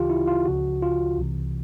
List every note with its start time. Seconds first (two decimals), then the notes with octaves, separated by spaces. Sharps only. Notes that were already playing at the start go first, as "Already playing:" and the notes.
Already playing: D2 C#3 E3 F4 G4
0.10 E4
0.27 F4
0.46 C#2 C#3 F3 F#4
0.82 F4
1.18 C2 C3 E3